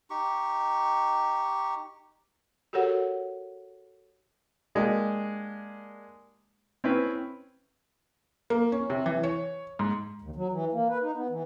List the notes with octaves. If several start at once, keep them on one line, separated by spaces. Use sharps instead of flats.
D#4 G4 C#6
F#4 G4 A4 A#4 C#5 F#5
G#3 A#3 D4 G4
C4 C#4 E4 B4
A#3
C#4
C3
E3
C#5
G#2
D#2
F#3
E3
A#3
B4
D#4
B3
E3